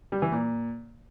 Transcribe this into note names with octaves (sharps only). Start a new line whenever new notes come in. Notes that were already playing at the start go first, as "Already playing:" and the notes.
G3
E3
A#2